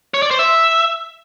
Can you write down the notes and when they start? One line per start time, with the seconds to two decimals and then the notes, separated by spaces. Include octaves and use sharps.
0.14 C#5
0.22 D5
0.31 C5
0.39 E5